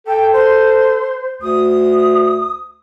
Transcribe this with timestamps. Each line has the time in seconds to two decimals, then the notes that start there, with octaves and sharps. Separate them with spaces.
0.07 A4 G5
0.33 C5
1.42 D2 D#6